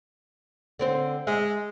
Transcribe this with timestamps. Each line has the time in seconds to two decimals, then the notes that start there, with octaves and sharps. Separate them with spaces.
0.79 D3 C4 C5
1.27 G#3 E5